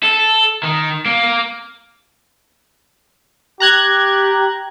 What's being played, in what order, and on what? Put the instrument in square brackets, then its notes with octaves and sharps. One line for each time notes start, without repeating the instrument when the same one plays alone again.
[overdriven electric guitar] A4
D#3
A#3
[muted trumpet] G4 [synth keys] A#5 F#6 G#6